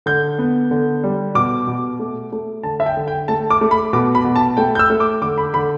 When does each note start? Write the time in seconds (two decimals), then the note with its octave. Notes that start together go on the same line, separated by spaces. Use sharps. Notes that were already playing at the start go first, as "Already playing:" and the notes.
0.06 D3 G6
0.39 B3
0.71 D3
1.04 G3
1.35 B2 D6
1.67 B2
1.99 A3
2.32 A3
2.63 D3 A5
2.80 E5
2.86 G5
2.97 D3
3.08 G5
3.28 A3 A5
3.50 D6
3.61 A3
3.71 B5
3.93 B2 D6
4.15 B5
4.25 B2
4.36 A5
4.57 A3 G5
4.75 G6
4.79 E6
4.90 A3
5.00 D6
5.22 D3 D6
5.38 B5
5.54 D3 B5